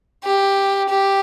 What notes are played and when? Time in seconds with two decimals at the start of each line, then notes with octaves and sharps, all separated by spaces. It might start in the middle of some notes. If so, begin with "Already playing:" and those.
0.25 G4
0.89 G4